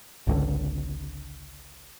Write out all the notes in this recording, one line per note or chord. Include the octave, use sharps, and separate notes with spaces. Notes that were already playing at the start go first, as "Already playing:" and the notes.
G#1 C#2 D3